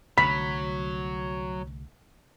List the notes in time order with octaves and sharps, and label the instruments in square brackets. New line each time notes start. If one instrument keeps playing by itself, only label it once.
[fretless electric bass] C2 D3 A3 [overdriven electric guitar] F#3 [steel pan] B5 [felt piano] B6